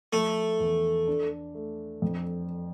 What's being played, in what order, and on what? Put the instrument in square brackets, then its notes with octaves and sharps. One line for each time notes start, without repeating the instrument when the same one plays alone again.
[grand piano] F3 [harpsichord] A3
[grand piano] E2
D4
A3
F2